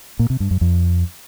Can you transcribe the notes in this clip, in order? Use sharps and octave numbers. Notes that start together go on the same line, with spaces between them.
A#2
C3
G2
F#2
F2